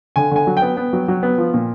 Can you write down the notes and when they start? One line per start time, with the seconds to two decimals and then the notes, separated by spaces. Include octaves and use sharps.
0.16 D3 G#5
0.31 D3 G#5
0.47 F#3
0.57 G5
0.62 B3
0.77 B3
0.93 F#3
1.08 F#3
1.23 B3
1.38 F3
1.54 A#2